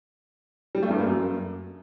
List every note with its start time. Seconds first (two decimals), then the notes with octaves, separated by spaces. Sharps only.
0.75 G3
0.83 A3
0.91 G2
0.99 A#3
1.07 F#2